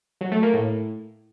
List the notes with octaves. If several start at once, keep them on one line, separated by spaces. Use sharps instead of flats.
F#3
A3
A#3
A2